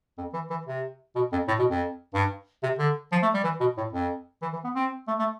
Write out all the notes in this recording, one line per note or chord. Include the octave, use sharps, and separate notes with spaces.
F2
E3
E3
C3
B2
F2
A2
B2
F2
G2
C3
D3
F3
A3
G3
E3
B2
A2
F2
E3
E3
B3
C4
A3
A3